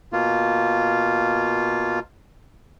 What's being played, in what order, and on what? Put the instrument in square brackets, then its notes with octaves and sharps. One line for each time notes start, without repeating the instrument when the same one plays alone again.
[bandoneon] B2 A#3 F4